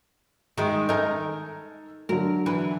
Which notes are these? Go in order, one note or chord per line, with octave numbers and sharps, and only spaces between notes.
D#3 G#3
D#4 A4 A#4 G#5
D3 F#3 A#4
E3